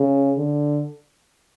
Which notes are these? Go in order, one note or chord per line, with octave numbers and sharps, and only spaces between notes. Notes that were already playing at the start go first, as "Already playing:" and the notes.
Already playing: C#3
D3